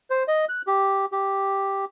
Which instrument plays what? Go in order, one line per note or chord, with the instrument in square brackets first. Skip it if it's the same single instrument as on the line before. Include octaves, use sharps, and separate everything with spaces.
[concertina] C5
D#5
F#6
G4
G4